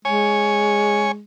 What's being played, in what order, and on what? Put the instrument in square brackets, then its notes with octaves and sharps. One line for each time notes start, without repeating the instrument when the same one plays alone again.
[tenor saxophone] G#3 [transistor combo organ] C#5 G#5